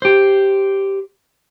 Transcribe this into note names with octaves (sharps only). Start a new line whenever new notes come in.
G4 C5